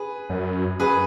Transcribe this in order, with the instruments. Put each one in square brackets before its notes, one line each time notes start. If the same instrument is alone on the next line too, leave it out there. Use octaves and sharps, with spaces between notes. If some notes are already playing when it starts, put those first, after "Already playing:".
Already playing: [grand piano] G#4 B4
[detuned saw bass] F#2
[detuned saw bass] F#2 [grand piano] G#4 B4